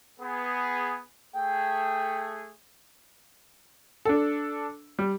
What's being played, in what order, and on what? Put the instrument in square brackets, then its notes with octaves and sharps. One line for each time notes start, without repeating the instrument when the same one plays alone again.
[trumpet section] B3 G#4
[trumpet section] A3 G#4 [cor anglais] G5
[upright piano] D4 A4
G3